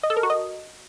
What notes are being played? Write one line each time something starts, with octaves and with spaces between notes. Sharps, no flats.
D#5
A4
A#4
F#4
D#5